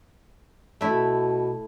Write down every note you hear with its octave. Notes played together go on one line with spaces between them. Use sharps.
B2 A3 E4